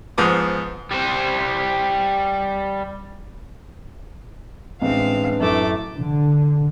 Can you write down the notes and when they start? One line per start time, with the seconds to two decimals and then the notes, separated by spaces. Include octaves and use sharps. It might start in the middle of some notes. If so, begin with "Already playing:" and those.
0.18 G#2 F3 B3 D6 D#6
0.91 G3 C5
4.82 A1 G#3 C4 D4 B4 F5
5.40 F#2 A2 A3 D6
5.96 D3